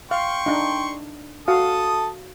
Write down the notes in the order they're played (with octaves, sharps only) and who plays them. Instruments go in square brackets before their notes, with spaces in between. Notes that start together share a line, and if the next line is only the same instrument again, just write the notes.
[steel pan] F5 [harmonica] G5 C6 C#6
[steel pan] D4 D#4
[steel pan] F#4 F5 [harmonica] A4 A5 D#6